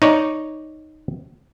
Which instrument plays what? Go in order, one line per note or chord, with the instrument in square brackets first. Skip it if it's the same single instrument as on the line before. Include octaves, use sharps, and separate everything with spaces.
[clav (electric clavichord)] D#4 C#5 D5